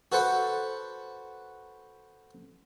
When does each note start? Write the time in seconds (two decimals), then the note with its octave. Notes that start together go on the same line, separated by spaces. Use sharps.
0.12 F#4 A4 B4 C5 F#5